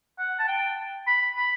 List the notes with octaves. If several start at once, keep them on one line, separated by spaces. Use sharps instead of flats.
F#5
A5
G5
B5
B5